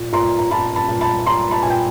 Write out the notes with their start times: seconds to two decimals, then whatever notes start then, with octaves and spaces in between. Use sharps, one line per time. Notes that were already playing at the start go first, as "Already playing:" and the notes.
Already playing: A#2
0.12 A#2 A#5 C6
0.39 A#5
0.51 A#2 A5 B5
0.76 A5 B5
0.88 A#2
1.01 A5 B5
1.26 A#2 A#5 C6
1.51 A5 B5
1.63 A#2 G#5
1.70 G5